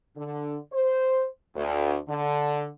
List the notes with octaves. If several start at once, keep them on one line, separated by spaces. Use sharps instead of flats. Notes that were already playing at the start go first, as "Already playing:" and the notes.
D3
C5
D2
D3